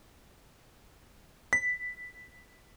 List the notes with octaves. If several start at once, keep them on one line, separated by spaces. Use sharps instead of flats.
B6